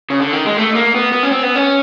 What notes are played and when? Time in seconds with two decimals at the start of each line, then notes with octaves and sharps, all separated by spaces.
0.10 C#3
0.20 D3
0.33 D#3
0.45 G#3
0.57 A3
0.75 A#3
0.95 B3
1.12 B3
1.23 C#4
1.31 C4
1.43 B3
1.56 C#4